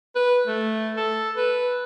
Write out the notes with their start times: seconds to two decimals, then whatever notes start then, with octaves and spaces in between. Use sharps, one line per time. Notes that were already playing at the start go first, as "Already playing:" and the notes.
0.15 B4
0.47 A3
0.97 A4
1.36 B4